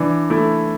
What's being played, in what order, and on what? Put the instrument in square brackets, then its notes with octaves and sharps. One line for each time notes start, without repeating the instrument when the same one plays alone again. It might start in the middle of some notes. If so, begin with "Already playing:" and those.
Already playing: [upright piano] E3 D4
A3 E4